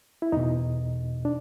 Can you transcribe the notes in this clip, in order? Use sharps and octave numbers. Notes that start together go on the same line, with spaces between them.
E4
E2 B2 D#4
D4